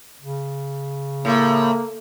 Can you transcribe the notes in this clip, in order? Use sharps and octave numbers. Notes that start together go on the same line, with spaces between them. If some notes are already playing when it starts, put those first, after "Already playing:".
C#3
A2 A#3